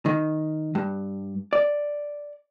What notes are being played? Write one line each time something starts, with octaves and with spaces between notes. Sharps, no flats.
D#3
G2
D5